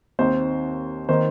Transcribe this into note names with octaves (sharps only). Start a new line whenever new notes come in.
D#2 D#3 C4 D#4 C5
D#3 A#3 D#4 C5